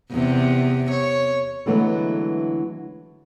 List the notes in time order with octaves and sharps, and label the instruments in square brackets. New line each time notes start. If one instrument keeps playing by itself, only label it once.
[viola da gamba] E2 C3
C#5
[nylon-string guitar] D3 E3 F#3 G#3 A3 B3